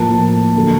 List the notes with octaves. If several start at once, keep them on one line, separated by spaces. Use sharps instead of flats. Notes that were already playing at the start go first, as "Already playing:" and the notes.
Already playing: A2 F3 A#3 A5
D3 F#3 A#3